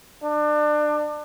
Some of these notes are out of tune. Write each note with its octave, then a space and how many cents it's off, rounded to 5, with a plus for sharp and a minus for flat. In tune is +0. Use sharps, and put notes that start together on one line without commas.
D4 +30